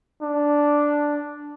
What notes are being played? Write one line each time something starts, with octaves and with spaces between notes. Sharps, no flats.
D4